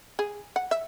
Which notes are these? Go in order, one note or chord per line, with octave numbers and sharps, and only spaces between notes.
G#4
F#5
E5